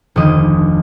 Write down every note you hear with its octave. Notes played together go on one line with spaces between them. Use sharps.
F1 D2 D#3 D#5 D6